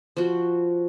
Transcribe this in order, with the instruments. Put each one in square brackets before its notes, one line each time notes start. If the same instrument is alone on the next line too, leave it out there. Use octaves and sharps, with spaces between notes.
[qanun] F3 F#4